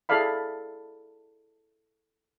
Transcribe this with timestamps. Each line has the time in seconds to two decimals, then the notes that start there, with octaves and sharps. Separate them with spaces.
0.09 E4 G#4 A4 D5 F5 B5